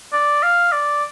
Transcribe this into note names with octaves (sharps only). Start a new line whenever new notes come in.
D5
F5
D5